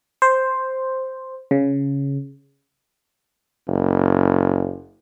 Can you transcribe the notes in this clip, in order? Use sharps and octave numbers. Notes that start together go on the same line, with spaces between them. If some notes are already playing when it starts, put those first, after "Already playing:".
C5
C#3
F#1